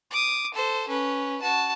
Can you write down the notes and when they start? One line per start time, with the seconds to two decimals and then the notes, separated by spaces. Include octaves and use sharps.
0.11 D6 D#6
0.54 A4 C5
0.88 C#4 B4
1.42 F#4 A5